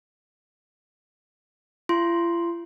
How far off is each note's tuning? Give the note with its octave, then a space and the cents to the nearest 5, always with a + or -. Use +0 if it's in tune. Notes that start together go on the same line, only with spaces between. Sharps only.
F4 -45 C6 +0